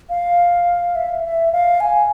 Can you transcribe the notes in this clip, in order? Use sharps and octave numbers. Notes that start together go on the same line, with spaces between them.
F5
E5
E5
F5
G#5